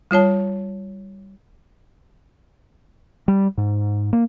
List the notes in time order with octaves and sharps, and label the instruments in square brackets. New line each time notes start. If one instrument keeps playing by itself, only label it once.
[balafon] G3 F4 C#5 A5
[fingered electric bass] G3
G#2
A#3